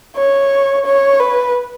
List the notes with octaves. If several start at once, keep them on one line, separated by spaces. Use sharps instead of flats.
C#5
C#5
B4